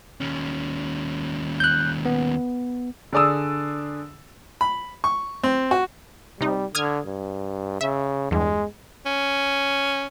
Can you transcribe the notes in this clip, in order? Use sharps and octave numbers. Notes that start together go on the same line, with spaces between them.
D#2 C#4
F#6 G6
B3
D3 G#4 D5 D#6 E6
B5
C#6
C4
F#4
C3 G3 D#4
D3 D#6 F6 G#6
G2
C#3 E5
E2 G2 G#3
C#4